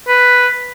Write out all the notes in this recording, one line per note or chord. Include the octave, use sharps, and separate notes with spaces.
B4